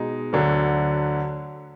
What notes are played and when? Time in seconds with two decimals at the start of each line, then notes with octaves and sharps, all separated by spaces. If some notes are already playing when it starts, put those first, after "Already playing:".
Already playing: B2 G#3 D#4
0.33 D2 D3 F#3